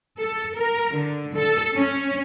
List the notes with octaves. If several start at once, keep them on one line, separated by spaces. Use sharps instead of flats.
A4
A#4
D3
A4
C#4